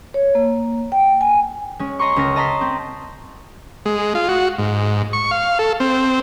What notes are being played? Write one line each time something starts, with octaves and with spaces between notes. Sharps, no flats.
C#5
A#3
G5
G#5
G#3 C#4
D#5 A#5 C6 C#6
C#2 C#4 A#4 A#6
D#5 A5 A#5 C6 D#6 B6
C4
G#3
F4
F#4
G#2
C#6
F5
A4
C4